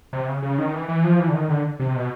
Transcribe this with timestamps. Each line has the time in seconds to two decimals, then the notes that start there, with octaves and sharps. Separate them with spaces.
0.13 C3
0.28 C#3
0.42 C#3
0.58 D#3
0.74 E3
0.89 E3
1.04 F3
1.19 E3
1.29 D3
1.34 D#3
1.49 D3
1.80 C3
1.96 B2